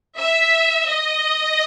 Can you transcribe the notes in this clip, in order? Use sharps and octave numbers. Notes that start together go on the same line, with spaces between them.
E5
D#5